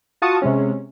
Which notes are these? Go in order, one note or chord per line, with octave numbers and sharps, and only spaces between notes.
F4 F#4 A5 C#6 D#6
C3 G#3 C#4